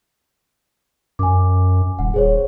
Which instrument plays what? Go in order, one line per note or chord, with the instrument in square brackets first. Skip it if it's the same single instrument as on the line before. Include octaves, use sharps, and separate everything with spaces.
[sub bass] F#2 [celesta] G#5 D6
[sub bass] D#1 [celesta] F#5
[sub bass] D#1 [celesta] G#4 C5 C#5